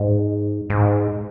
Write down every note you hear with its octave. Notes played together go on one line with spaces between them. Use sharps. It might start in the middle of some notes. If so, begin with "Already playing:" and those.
Already playing: G#2
G#2